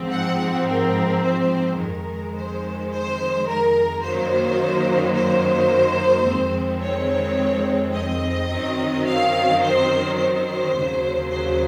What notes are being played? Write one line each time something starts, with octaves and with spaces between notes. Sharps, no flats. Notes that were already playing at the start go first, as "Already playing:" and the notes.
Already playing: G#2 F3 C4
F#5
A#4
C5
F2 D#3 G#3 A#4
C5
C5
A#4
F#2 D#3 F#3 A#3 C5
C5
F2 D#3 G#3 C4
C#5
D#5
F#2 D#3 F#3 C4
F5
C5
C5
D#2 C#3 F#3
C5